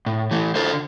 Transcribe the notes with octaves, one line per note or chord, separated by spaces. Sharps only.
A2
E3 A3
D3 A4 C5